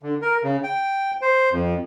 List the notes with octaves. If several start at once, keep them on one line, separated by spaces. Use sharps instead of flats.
D3
A#4
C#3
G5
C5
F2